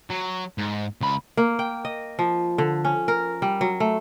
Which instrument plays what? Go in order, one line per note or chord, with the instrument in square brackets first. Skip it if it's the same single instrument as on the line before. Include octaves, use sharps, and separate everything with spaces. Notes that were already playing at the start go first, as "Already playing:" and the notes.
[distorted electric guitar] F#3
G#2
C#2 B5
[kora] A#3
G5
D#5
F3
D3
C#4
A#4
G3
F#3
A3